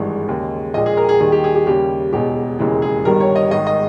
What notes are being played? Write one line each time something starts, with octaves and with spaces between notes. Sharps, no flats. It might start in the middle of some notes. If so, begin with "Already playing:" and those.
Already playing: G#1 G2 E3 G#3
D#2 C#3 G#3
A#1 A#2 G#3 D#5
G#4
A#4
G#4
D#2 D#3 G3 G#4
G4
G#4
G4
D#2 C#3 G3 G4
E1 E2 B2 G4
E1 D#2 C#3 E3 G#3
G#4
G1 G2 D#3 G3 A#4
C#5
D#5
G#1 G#2 D#3 G#3 D#5
D#5